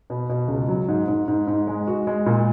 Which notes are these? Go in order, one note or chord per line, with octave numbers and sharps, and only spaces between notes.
B2
B2
C#2
F#3
G#2
G#2
G#2
G#2
G#3
F#4
G#3
A#2